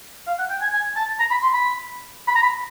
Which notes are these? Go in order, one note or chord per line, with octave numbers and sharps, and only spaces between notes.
F5
F#5
G5
G#5
G#5
A5
A#5
B5
C6
B5
B5
A#5
B5